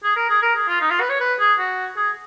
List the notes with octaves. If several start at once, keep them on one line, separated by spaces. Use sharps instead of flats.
G#4
A#4
G#4
A#4
G#4
F4
D#4
F4
B4
C#5
B4
G#4
F#4
G#4